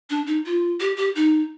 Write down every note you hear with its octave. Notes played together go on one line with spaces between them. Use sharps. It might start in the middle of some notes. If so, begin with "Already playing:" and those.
D4
D#4
F4
G4
G4
D#4